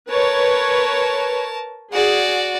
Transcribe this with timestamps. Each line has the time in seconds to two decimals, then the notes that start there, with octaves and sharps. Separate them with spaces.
0.11 A#4 B4 C#5 A5
1.93 F#4 G#4 D5